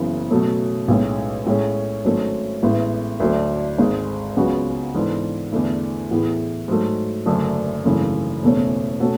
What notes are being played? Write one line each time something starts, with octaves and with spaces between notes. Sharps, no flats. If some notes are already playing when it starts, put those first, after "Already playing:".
Already playing: F#1 F#2 C#3 E3 B3
B2 F#3 A3 C#4
B1 A2 G#3 C#4
A2 G#3 C#4 G#4
G#1 G#2 F#3 A3 C#4
A1 A2 G#3 B3 E4
D2 D3 F#3 A3 D4
G#1 G#2 G#3
C#2 C#3 F#3 B3 F#4
G#2 E3 B3 D4 A4
E2 D3 A3 E4
A2 E3 B3 E4 G#4
G#2 F#3 A3
F#1 F#2 D3 A3 D4
G#1 F#2 C#3 E3 A3
F#1 E2 B2 A3 C#4
B2 A3 C#4 F#4 A4